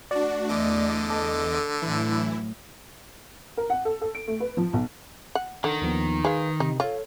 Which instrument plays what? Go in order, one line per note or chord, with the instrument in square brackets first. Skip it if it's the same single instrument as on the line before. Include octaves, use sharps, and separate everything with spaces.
[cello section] A3 [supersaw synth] D4 F#4 [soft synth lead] D5
[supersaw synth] E2 D#5 D6 [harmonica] D3
[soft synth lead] A4
[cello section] A2 F#3 [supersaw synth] E3 E4
[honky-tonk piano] A#4
F#5
A4
A4
D7
A3
B4
F3
B1
[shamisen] F#5
[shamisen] D3 [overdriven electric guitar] D#3
[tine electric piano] D#2 F3 B3
[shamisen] G#3 F5 [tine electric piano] B4
[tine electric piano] C3 [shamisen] D#4
[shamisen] F4 [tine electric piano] A4 C#5